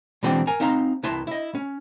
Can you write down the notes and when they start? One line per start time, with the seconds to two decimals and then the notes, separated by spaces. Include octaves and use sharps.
0.23 B2 E3 G#3 C4 D4 G5
0.47 A#4 G#5
0.60 C4 D#4 F5 A#5 C6
1.03 C2 E4 B4 A5 C6
1.27 E4 D#5
1.55 C#4